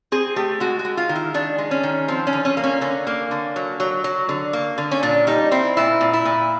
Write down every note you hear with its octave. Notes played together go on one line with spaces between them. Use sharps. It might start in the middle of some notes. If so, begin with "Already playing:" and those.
C4 G#4
A3 G4
G#3 F#4
F#4
G#3
F4
D#3
E4
D#3 D4
G#3
C#4
D#3
F3 C4
C#4
D3
C#4
A#3
C#4
D3 C#4
A#3
D3
F#3
F#3
F#3
D3
A#3
D3
C#4
A#2 D4
G3 D#4
C4 E4
A#2 E4
A#2
E4
A#2